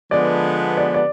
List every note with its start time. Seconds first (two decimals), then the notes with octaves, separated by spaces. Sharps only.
0.11 D3 F3 G#3 B3 D5
0.77 D5
0.94 D5